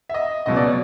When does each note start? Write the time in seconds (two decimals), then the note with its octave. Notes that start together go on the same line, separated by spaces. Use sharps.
0.09 E5
0.14 D#5
0.46 C#2 B2 F#3 D#5
0.56 D5
0.67 C#5